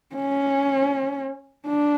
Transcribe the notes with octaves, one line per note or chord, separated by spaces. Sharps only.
C#4
D4